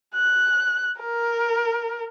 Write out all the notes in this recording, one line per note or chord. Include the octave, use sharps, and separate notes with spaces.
F#6
A#4